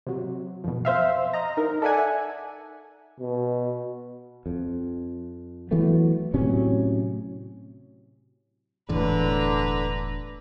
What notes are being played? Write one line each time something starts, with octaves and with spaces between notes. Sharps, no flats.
C3 F#3
F2 B2
C5 E5 F5
D#5 A#5
D#4 A#4
A4 D5 E5 F#5 G#5
B2
F2
E3 F#3 A3 B3
A2 C3 F#3 C#4
E1 E2 A2 D3 B4 A#5